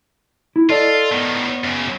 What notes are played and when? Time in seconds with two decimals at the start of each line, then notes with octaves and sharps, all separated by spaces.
0.56 E4
0.70 F4 A4 D5 D#5
1.12 A2 D#3 B3
1.64 F#2 C#3